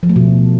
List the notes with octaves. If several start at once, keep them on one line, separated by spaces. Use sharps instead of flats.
F3
A3
B2